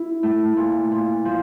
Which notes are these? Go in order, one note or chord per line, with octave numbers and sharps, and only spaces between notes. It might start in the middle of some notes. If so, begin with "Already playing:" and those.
Already playing: E4
A3
A#2
A#2
F3